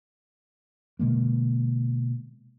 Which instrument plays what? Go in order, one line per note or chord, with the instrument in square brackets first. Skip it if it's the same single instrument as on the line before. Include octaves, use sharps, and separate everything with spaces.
[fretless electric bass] B2 D3 G#3 A#3